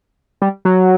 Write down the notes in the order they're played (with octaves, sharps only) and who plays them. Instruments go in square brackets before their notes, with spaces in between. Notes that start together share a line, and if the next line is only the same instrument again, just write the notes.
[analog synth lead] G3
F#3